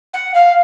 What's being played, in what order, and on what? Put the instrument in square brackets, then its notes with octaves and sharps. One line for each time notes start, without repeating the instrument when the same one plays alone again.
[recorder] F#5
F5